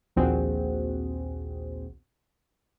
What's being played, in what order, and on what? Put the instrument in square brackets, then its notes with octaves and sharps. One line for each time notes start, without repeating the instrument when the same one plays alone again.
[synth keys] A#1 D#2 A#2 C4 F#4 G#4